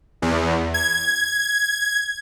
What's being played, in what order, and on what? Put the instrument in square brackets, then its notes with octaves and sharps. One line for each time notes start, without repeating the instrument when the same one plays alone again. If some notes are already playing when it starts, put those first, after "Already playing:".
[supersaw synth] E2
G#6